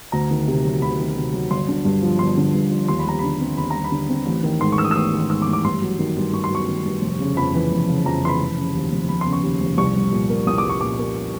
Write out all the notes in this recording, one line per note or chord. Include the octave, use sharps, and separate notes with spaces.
D2 A#5
D#3
C3
F#3
D2 B5
D#3
C3
F#3
G1 C6
D3
G2
F3
G1 C6
D3
G2
F3
D#2 C6
B5
G3 A#5
D3 B5
C4
D#2 B5
G3 A#5
B5
D3
C4
A1
D#3
G#2 C6
C#6
A1 E6
D#6
E6
A1 D#6
D#3
G#2 E6
D6
A1
D6
G2 C6
F#3
D#3
G2
G2 C#6
C6
F#3 C#6
D#3
G2
F1
C#3
F2 B5
E3
F1
C#3
F2 A#5
E3 C6
B5
F1
C#3
D#2
F1
F1 B5
C6
C#3
C#6
D#2
F1
C2 C#6
G3
A#2
A#3
C2 D#6
D6
G3
C#6
A#2 D6
A#3